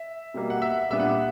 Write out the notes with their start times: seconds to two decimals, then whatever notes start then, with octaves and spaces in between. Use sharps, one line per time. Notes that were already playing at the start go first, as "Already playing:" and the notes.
Already playing: E5
0.34 B2 G3 A#3
0.50 F#5
0.62 E5
0.90 A#2 G3 B3 D4 E5
1.00 F#5
1.10 E5